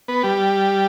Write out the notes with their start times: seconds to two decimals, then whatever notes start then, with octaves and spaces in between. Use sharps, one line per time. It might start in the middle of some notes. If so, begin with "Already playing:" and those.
0.08 B3 B4
0.23 G3 G4